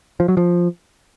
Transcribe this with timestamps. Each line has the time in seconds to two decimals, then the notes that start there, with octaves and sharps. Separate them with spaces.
0.20 F3
0.28 F#3
0.37 F3